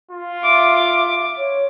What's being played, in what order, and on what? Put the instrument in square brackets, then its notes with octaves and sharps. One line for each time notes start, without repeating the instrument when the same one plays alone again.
[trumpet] F4
[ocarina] E5 [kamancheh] D6
[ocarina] C#5